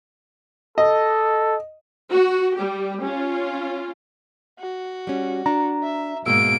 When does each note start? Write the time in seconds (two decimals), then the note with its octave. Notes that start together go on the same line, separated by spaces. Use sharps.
0.78 A4 D#5
2.11 F#4
2.56 G3 G4
3.05 C#4 F4
4.60 F#4
5.07 G3 C#4
5.46 D4 A#5
5.83 E5
6.26 G#2 B2 G#3 A#3 E6 D7